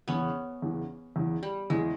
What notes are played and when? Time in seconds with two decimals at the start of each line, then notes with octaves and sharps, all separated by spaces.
0.08 E2 C#3 E3 B3 C#4
0.62 E2 C#3 E3
1.16 E2 C#3 E3
1.43 G3
1.70 E2 C#3 E3 G#3